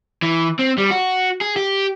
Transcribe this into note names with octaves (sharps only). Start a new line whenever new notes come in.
E3
C4
G3
F#4
G#4
G4